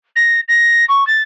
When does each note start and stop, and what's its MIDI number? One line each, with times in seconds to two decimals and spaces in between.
0.16 0.40 94
0.48 0.85 94
0.89 1.06 85
1.07 1.22 93